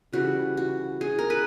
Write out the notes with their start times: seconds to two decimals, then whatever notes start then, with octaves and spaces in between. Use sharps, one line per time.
0.13 C#3 E3 G3 F#4
0.57 F#4
1.01 G#4
1.19 A#4
1.30 B4